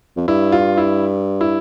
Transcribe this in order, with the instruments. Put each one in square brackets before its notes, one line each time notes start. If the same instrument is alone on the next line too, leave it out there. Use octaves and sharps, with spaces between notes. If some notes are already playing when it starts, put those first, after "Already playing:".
[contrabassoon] F2
[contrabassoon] G2 [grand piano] E4
[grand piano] F4
E4
E4